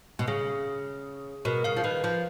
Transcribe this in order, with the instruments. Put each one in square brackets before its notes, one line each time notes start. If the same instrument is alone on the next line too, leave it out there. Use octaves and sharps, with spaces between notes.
[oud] B2
[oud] C#3 [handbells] G#4
[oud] B2 [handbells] A#4
[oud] C#3 [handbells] F5
[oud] F3
[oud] D#3 [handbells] B4
[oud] F3